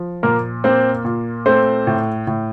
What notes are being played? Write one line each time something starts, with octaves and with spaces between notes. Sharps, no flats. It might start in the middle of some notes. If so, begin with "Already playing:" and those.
Already playing: F3
A#2 A#3 A#4
A#3 C4 C5
A#2
A3 C4 C5
A2
A2